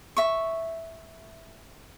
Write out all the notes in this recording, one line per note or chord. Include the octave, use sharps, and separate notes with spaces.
E5 C#6